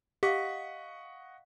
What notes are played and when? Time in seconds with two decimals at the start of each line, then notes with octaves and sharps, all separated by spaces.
0.23 G4 D#5 F5 F#5 C#6 B6